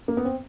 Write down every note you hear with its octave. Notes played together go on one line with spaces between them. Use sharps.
A#3
B3
C4